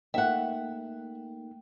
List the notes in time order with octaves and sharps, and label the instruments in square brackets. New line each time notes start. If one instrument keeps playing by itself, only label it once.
[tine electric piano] A3 A#3 D#4 [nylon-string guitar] E5 F#5 [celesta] G5